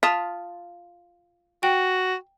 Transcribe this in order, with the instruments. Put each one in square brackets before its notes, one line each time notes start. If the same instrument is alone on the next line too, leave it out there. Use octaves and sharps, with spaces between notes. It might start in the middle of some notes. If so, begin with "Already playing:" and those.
[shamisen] F4 [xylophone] A5 D#6 B6
[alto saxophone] F#4 [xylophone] G5